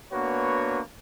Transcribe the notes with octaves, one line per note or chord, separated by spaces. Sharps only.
A#3 B3 D4 F#4 B4 C#5